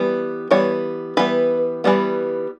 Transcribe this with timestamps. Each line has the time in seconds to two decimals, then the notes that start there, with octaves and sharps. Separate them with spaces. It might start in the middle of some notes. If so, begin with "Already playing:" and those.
Already playing: E3 G3 B3
0.51 E3 G3 B3 C#5
1.17 E3 G3 B3 B4
1.84 E3 G3 B3